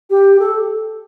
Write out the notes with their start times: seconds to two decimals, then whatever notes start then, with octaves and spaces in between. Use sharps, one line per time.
0.10 G4
0.39 A4